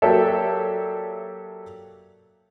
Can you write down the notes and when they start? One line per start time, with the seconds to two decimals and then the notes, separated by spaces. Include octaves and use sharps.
0.02 F#3 A#3 G4 A4 D5 E5